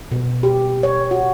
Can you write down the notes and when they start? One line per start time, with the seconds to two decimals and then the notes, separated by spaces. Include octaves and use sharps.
0.12 B2
0.43 G4
0.83 C#5
1.11 F#4